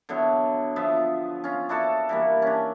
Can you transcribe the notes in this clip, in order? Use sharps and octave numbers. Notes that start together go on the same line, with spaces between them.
D3 F#3 B3 E4
F3 B3 E5
C#4 F4
D4 E4 F#4 A4
E3 G3 A#3
C#4 D4